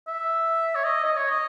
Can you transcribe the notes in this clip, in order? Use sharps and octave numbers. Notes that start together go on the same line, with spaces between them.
E5
C#5
D#5
D#5
C#5
D#5